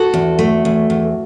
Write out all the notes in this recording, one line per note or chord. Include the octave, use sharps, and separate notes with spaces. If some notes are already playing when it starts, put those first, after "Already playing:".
Already playing: F#4 A4
E2
A3
E2
E2